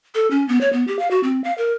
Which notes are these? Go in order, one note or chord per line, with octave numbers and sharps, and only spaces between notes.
A4
C#4
B3
C#5
B3
G4
F5
F#4
C4
F5
A#4